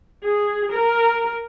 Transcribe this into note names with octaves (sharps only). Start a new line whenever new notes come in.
G#4
A#4